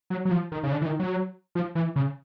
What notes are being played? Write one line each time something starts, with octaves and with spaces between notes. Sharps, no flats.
F#3
F#3
F3
D#3
C#3
D3
E3
D#3
F#3
F3
E3
C#3